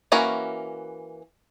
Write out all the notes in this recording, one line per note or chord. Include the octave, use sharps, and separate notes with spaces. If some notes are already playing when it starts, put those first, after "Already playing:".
E3 A#3 C#4 F#4 A#4